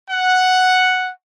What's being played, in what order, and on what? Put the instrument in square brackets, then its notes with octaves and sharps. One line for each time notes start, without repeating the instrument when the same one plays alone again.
[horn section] F#5